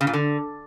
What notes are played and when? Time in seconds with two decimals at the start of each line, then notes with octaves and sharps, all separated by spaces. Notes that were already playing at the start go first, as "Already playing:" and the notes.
0.01 C#3
0.07 A#2
0.13 D3